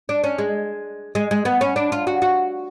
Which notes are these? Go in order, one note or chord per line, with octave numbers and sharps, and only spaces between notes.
D4
C#4
G#3
G#3
G#3
B3
C#4
D4
F4
F#4
F#4